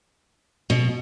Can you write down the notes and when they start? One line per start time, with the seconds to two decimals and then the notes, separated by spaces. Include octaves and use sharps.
0.70 B2